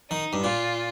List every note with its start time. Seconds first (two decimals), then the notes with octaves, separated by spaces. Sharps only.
0.10 D#3 D#4
0.33 G2
0.44 A#2 F4